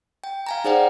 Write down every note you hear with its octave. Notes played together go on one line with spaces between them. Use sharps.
G5
F5 G#5 A#5
D#4 G#4 C5 D5 F#5 G5